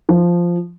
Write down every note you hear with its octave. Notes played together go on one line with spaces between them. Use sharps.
F3